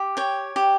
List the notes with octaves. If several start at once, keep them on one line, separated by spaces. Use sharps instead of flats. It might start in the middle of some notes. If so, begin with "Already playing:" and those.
Already playing: G4
C#5 G5
G4